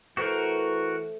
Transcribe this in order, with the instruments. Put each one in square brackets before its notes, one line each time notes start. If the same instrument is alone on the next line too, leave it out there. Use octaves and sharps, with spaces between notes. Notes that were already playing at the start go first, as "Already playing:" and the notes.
[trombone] E3 [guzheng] A3 C5 [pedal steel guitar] F#4 A#4